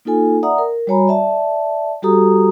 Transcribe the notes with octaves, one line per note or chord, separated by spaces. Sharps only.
A#3 D#4 F4 A4 G#5
D5 E5 F#5 A#5 D#6
A#4
G3 F#4 C#5 G#5 A#5 B5
D5 E5 A5
G3 F#4 G4 A4 A#5 D#6